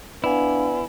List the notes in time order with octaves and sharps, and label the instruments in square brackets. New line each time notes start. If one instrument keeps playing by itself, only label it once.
[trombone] B3 [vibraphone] D4 F5 [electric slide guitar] E4 [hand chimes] D5 G#5